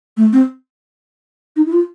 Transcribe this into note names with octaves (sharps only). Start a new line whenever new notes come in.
A3
C4
D#4
E4
F4